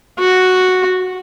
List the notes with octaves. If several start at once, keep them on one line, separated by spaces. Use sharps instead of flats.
F#4